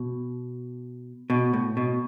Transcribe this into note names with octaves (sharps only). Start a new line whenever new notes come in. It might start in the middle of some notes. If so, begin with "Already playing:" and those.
Already playing: B2
B2
A2
B2